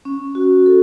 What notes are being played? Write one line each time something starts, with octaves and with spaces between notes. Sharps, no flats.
C#4
F#4
A4